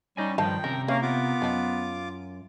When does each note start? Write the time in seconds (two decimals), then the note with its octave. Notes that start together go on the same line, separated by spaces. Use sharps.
0.17 G3 C#4 D#4 D#5 G#5
0.38 G2 D#3 F3 C5 F5 G5 A5
0.64 C3 C#4 A#4
0.88 A#3 C#4 B4 E5 F5
1.02 B3 F4 D6
1.42 F#2 D#3 F3